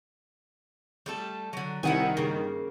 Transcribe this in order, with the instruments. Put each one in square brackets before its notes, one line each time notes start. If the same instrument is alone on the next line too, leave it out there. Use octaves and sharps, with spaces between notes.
[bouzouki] G3 A3 A4
D3 F#3
[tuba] C2 [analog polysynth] D#3 [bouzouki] E4 F#5 G#5
[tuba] G2 [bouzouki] C#3 A#3